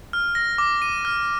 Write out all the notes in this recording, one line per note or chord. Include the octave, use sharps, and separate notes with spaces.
F6
A#6
D6
D#7
F6